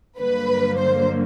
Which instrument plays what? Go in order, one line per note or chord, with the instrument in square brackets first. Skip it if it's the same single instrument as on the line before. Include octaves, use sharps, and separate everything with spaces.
[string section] G2 D3 F#3 A#3 B4
C5